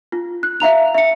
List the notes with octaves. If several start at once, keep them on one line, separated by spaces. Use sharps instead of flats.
F4
F#6
E5 F5 A#5 F7
E5 C#7